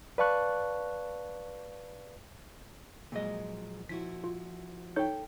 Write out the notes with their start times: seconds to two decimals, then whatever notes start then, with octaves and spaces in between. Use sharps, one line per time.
0.18 B4 D5 F5 A5 C#6 F#6
3.12 A#2 F3 F#3 G#3 D#5
3.89 F3 E4 F#4 B6
4.24 F4
4.96 D#4 A4 C#5 G5 G6